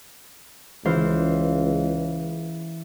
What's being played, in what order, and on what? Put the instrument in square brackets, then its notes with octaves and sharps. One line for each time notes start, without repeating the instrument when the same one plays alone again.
[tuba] C#2 [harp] E3 C5 F5